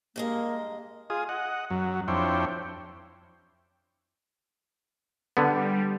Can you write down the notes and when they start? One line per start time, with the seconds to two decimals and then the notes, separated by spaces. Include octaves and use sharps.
0.16 G2 G#3 A#3 D#5
1.10 F4 G#4 D#6
1.29 D#5 F#5
1.70 F#2 F#3
2.08 F2 D4 E4 C5 C#5 G5
5.37 D3 G3 B3